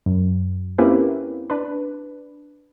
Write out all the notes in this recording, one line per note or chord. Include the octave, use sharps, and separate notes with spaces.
F#2
A#3 C4 C#4 E4 G4 B4
D4 B4